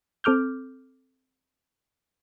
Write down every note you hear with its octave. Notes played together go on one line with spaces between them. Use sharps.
C4 A4 D6 F6 G6